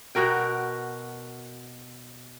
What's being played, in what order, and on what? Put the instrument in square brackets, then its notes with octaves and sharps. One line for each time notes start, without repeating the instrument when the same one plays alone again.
[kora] B2 F#4 A#4 G5